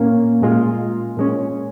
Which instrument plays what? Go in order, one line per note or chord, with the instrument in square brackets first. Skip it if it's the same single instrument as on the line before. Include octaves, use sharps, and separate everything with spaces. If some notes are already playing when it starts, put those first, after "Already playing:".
Already playing: [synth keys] A#2 A#3 C#4
A#2 G#3 F4
A#2 G#3 C#4